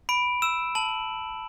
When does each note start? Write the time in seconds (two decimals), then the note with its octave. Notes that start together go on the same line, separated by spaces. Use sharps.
0.09 B5 D7
0.42 E6 E7
0.75 A5 F#7